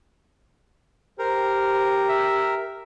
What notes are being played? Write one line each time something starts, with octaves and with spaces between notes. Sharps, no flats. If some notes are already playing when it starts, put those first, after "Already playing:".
G4 A#4 C5
E5